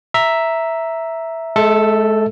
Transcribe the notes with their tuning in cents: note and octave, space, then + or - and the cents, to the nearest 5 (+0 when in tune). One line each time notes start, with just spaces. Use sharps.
E5 +0 A#5 +0
G#3 +35 A4 +0 E5 +0